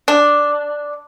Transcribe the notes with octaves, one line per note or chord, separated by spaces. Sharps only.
D4